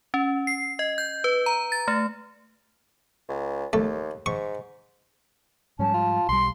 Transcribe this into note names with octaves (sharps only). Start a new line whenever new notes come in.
C#4
C7
D#5
G6
B4
A#5
A6
A3
C#2
D#2 A3
G#2 C#6
G#2 F3 G3 C#4 A5
F4
B1 G3 C6